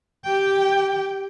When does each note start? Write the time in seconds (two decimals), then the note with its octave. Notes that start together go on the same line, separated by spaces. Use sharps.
0.24 G4 G5